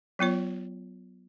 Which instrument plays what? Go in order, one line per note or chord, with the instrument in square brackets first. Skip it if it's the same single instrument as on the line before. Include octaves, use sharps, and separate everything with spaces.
[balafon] F#3 B3 F4 C#5